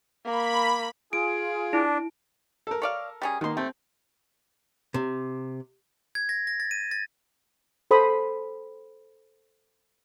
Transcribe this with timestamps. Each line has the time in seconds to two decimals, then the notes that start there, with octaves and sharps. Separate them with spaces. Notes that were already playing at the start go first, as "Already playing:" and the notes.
0.25 A#3 B5
1.13 F4 G#4 D7
1.73 D4 E4
2.67 A4 A#4
2.82 C#5 D5 F5
3.22 G3 C#4 G#4
3.41 B2 D#3 A#3 C6
3.57 A3 C4
4.94 C3
6.15 G#6
6.29 A#6
6.47 A#6
6.60 A6
6.71 D#7
6.91 A6
7.91 A4 C5 B5 D#6